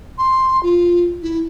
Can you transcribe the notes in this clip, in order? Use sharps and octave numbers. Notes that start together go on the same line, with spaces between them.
C6
F4
E4